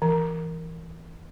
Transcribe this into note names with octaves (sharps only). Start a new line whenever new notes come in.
E3